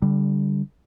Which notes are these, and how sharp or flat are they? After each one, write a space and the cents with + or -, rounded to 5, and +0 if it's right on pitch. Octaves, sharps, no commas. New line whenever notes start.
D3 -20 G3 +0